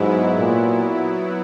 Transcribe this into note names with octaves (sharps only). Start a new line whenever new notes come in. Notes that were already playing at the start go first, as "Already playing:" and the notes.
Already playing: G#2 F#3 B3 E4
A#2